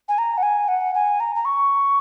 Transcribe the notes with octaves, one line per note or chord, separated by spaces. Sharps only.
G#5
A#5
F#5
G#5
F#5
G#5
A#5
A#5
C#6